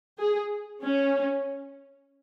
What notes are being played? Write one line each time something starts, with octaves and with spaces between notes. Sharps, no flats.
G#4
C#4